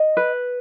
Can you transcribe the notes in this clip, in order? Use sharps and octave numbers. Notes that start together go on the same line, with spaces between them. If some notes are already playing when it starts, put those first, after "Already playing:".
Already playing: D#5
B4